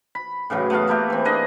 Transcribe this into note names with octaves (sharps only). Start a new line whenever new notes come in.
B5
A2 C#3 E3 F#3
A3 B3 F#4 F5
A3 A#3 E4 G4
E3 C4
A#3 D4 G#4 D#5